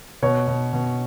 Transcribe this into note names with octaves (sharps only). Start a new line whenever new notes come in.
B2 C#5
B2
B2